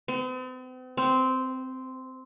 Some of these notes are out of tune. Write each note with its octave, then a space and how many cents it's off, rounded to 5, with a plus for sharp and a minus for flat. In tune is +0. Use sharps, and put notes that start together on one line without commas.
C4 -45
C4 -10